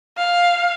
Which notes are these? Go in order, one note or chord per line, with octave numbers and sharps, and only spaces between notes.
F5